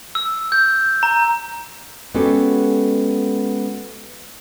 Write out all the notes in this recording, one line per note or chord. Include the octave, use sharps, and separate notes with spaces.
E6
G6
A#5
G#3 B3 C#4 F#4 G4 A4